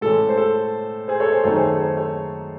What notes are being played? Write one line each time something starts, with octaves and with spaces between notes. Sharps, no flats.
A2 E3 G#3 C#4 A4
C5
A4
G#4 C5
A4 C#5
G#4 C5
F#2 D#3 A3 C4 D#4 A4 C#5
G#4 C5
A4
G#4 C5
A4 C#5